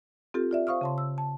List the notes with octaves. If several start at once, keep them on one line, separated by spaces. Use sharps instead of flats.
C4 F4 G4 A4
F4 D5 E5
C5 F5 C#6 D#6 F6
C#3 A5 C6
E6
A5